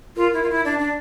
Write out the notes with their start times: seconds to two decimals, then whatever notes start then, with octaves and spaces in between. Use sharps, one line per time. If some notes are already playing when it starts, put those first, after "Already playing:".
0.16 F4 A#4
0.33 E4
0.42 F4
0.50 E4
0.65 D4 D5
0.79 D4